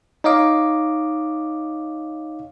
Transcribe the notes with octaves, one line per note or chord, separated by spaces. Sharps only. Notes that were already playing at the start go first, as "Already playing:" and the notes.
D#4 C#5 D#5 F5 D6